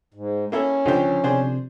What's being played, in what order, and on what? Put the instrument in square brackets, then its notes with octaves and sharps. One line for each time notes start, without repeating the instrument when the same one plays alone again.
[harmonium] G#2
[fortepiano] A#3 E4 A4 [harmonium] C#4
[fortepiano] C#2 G4 [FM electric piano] D3 F3
[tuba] C3 [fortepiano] D4 G#4 C5